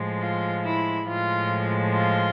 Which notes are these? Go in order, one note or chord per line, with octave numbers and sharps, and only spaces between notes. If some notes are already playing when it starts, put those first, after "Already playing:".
Already playing: A2 F3 G#3
F4
E4
A2 F3 G#3 F4
F4